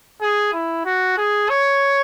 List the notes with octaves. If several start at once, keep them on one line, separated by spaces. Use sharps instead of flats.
G#4
E4
F#4
G#4
C#5